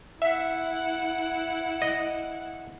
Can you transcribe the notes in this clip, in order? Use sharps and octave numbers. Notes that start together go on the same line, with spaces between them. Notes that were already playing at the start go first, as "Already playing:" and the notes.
E4 E5 F#5
D#5